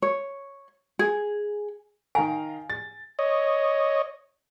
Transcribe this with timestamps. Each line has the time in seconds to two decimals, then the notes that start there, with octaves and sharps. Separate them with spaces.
0.02 C#5
0.99 G#4
2.15 D#3 F5 G#5 A#5
2.70 A6
3.19 C#5 D#5